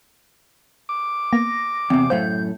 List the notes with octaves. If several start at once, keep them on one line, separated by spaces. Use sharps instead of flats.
D6
A#3 B3 A#6
E2 C3 C4
F#2 A2 A3 C5 F5 G6